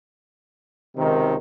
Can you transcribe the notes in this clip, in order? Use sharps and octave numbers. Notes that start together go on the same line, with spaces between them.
C#2 C3 D#3